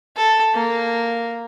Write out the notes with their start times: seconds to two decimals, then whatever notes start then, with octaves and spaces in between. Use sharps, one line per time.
0.17 A4
0.54 A#3